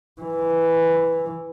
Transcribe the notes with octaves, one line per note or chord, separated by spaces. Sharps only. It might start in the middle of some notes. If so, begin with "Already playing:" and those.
E3